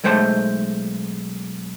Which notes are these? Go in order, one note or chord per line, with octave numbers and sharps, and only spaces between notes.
B1 G#3 A3 C5 F#5 A5